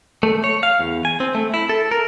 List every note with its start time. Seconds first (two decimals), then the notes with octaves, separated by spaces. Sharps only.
0.23 A3
0.44 C#5
0.63 F5
0.80 E2
1.05 G#5
1.20 C4
1.35 A3
1.54 E4
1.69 A4
1.91 A#4